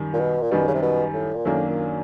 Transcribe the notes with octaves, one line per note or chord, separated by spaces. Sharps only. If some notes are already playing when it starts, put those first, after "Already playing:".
Already playing: F#2 D#3 G3
A#2
B2
A#2
F#2 B2 D#3 G3
C#3
C3
B2
A2
A#2
F#2 A2 D#3 F#3 A#3 D4
A#2